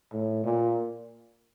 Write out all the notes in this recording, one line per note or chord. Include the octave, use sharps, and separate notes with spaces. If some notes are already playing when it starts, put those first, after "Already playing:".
A2
A#2